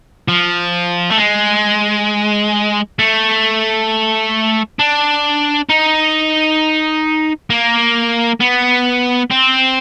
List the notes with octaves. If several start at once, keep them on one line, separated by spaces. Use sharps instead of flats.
F3
A3
G#3
A3
D4
D#4
A#3
B3
C4